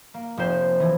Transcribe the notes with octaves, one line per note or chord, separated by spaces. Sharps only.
A#3
F1 C5
E3